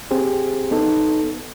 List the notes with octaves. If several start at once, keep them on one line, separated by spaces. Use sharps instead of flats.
C4 G4 G#4 C5
B3 D#4 A4